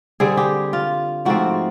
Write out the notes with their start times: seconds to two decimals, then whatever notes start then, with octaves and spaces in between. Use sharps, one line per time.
0.20 D3 G3 C4 G#4
0.37 G4
0.73 F4
1.25 G#2 F3 A3 C4 F#4